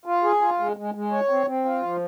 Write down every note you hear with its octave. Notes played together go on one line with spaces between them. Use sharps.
F4
G#4
F4
G#3
G#3
G#3
C#5
C4
C4
F4
F3